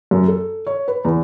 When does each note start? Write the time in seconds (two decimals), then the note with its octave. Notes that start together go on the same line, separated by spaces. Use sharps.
0.11 F#2
0.28 A4
0.67 C#5
0.88 B4
1.05 E2